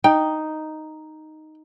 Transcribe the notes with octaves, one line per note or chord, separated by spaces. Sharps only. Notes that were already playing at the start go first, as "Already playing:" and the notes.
D#4 G5